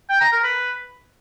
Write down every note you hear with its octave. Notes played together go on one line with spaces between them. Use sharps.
G5
A#5
A#4
B4